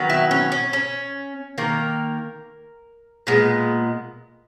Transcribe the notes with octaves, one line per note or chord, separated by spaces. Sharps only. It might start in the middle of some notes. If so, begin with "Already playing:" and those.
Already playing: D#3 F#3 B3
E4
C#4
C#4
C#4
D#3 A#3 A#4
A#2 G#3 B3